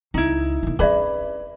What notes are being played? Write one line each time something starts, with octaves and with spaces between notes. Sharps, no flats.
C#2 D#4 E4
D#3 B3
C4 C#4 G#4 B4 D5 E5 B5